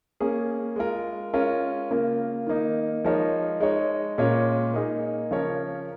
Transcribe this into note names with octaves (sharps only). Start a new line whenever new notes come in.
A#3 C#4 G#4
G#3 F4 A#4
G#3 C#4 F4 A#4
C#3 A#3 F4 A#4
D#3 A#3 D#4
F3 G#3 D#4 A#4 C#5
G#3 D#4 C#5
A#2 G#3 C#4 A#4 C#5
A#3 D#4 G#4
C#3 F3 C#4 A#4 C#5